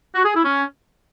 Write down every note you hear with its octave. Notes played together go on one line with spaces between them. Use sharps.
F#4
G#4
E4
C#4